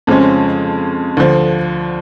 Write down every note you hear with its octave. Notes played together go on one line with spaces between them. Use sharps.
F2 C#3 F3 G#3 C#4
D2 D3 F3